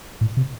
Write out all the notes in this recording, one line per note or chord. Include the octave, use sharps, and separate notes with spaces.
A2
C3